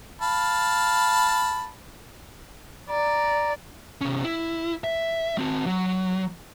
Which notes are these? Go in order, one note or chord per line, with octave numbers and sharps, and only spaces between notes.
F5 A5 B5
D5 A#5
C3 C#4
E4
E5
C4 F#4
F#3